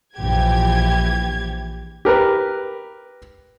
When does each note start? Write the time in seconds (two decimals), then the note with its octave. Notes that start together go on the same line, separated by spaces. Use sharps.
0.17 A#1 E3 G4 G#6
2.05 G4 A#4 B4